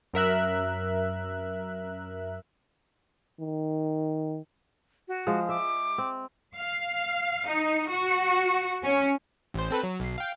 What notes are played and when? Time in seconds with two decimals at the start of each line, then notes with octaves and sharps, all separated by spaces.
0.13 F#2 A#4 E5 F#6
3.40 D#3
5.08 F#4
5.27 F3 G#3
5.49 E5 D6
5.98 C4
6.56 F5
7.48 D#4
7.88 F#4
8.84 C#4
9.54 A1 C5
9.71 C4 A4 B4
9.84 F#3
10.00 B1 C7
10.18 F5 G5